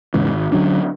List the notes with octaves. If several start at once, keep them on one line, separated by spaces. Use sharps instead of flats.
D#2 G#2 C#3 E3
G#1
D3 F#3 C#4 D4